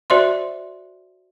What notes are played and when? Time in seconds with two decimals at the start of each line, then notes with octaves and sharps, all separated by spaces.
0.10 F#4 C5 D5 E5 C6